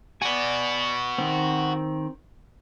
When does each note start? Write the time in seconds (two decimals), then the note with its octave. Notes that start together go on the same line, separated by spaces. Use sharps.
0.22 F#4 B4 D5 G#5
1.18 D#3 C4